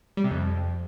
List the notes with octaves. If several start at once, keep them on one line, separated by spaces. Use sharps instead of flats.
G3
C3
F2